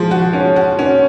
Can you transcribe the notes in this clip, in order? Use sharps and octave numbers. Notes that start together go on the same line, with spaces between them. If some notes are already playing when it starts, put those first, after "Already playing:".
Already playing: F3 G#3
F#4
C#4
F#4
C#4